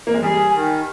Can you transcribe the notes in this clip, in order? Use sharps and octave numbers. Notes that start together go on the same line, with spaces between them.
A#3
G#3
G3 G#4
D#3